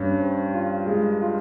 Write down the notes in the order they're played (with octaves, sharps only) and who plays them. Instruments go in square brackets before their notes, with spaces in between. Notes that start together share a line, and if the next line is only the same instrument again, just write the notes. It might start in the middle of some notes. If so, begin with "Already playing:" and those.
Already playing: [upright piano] G2 [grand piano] C#4
[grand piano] C5
F4
G#3
F4